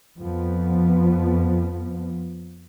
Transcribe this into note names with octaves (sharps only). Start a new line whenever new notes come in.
F2 F3 B3